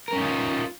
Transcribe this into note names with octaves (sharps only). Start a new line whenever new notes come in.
C#4 D#4 F4 A#4